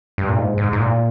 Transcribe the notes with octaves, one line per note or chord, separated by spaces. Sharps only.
G2
A#2
G#2
G#2
G#2
A#2